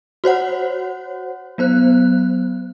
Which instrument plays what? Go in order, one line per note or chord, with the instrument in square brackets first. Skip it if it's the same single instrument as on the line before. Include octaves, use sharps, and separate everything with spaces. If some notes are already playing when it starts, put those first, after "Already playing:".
[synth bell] F#4 C5 C#5 F#5
F#3 B3 C5 F#6